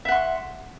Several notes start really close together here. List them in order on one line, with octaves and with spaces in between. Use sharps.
E5 F#5 C6 C#6